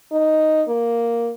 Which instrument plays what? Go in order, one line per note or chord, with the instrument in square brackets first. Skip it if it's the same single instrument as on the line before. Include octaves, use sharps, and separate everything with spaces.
[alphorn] D#4
A#3